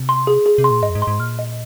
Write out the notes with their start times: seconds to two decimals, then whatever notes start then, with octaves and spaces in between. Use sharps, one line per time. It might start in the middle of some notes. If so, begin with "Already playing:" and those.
Already playing: C3
0.09 C6
0.27 G#4
0.46 G#4
0.58 C3
0.64 C6
0.71 A#2
0.82 G#2 D#5
0.90 F2
0.95 G#2
1.02 C6
1.07 G#2
1.19 A#2 F6
1.39 D#5